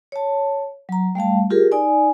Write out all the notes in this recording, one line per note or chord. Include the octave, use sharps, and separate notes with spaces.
C#5 A5
F#3 A#5
G3 A3 F5 A5
F4 G4 G#4 A#4
D#4 D5 G#5